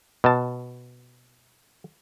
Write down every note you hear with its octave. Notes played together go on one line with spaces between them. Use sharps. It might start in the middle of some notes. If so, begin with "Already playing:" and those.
B2 A5